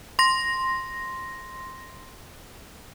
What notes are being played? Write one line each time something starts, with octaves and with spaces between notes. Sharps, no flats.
C6 A#6